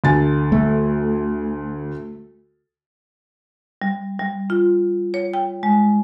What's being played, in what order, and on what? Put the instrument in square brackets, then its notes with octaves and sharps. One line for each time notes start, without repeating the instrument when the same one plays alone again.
[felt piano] D2 G#5 A6
[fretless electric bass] A3
[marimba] G3
G3
F4
C#5
G5
G#3